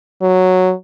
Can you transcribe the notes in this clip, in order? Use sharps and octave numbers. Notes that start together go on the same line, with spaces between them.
F#3